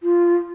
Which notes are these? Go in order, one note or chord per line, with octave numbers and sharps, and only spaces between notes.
F4